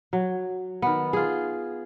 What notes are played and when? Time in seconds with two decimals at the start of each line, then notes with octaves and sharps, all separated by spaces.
0.13 F#3
0.82 D#3 B3
1.13 F4 G#4